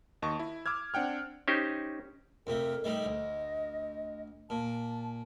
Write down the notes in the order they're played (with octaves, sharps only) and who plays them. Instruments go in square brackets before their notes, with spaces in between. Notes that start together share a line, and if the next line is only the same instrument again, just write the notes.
[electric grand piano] D#2 D#5 A5 C#6
E4
D6 E6 F6 G#6
C4 D4 F#5 G5 F6
[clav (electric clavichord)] C#4 D#4 G4 C5
[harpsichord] F2 C3 A3 [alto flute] A#4
[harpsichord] D#3 G3 A3 [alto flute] D#5
[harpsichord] D2
[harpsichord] A#2 [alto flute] A5